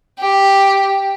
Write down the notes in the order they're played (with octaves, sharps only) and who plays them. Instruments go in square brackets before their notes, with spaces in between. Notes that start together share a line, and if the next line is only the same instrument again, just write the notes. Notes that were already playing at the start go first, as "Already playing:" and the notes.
[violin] G4